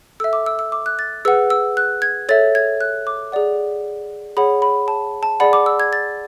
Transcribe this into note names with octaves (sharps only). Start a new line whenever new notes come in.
A4 E5 E6
D6
E6
E6
D6
F#6
A6
G#4 B4 F#5 E6
E6
F#6
G#6
A4 C#5 E5 A6
G#6
F#6
D6
G#4 D5 F#5
G#4 C#5 F#5 B5
B5
A5
A5
G#4 D5 F#5 B5
D6
E6
G#6
A6